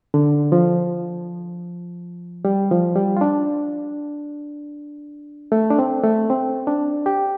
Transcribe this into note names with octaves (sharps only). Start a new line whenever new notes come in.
D3
F3
G3
F3
G3
F4
D4
A3
D4
C4
A3
C4
D4
G4